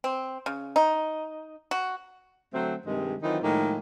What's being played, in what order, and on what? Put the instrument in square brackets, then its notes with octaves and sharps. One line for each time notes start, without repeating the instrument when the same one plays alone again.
[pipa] C4
C#3
D#4
F#4
[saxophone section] D3 F#3 A3 C4
G2 C3 D#3 G#3
D#3 E3 F#3 C4 D#4 F4
A2 D#3 F3 G#3 A#3 A4